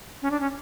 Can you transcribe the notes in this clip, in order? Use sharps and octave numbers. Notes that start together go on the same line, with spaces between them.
C#4
D4
C#4